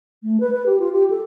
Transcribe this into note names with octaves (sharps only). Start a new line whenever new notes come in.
A3
B4
B4
G4
F4
G4
A4